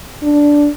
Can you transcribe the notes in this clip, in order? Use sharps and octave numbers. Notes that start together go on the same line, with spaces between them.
D4